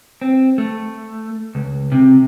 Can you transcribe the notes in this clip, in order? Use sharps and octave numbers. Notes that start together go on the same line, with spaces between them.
C4
A3
C#2
C3